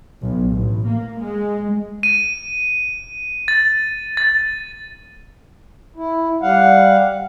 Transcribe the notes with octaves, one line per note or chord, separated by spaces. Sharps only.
B1
A1
A#3
G#3
D#7
A6
A6
E4
G3 F5 F#5